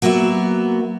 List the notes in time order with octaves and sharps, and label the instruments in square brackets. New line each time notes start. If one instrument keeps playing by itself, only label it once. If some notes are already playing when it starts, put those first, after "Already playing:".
[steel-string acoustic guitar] F#3 A#3 B3 F#4 E5